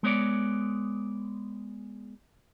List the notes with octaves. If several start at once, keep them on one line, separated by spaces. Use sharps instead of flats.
G#3 B3 C#5 D5